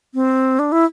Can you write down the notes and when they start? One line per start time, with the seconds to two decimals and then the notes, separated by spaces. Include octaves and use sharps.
0.14 C4
0.59 D4
0.72 E4